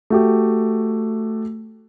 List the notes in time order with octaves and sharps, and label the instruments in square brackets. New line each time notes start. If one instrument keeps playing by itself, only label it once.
[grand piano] A3 F#4 G4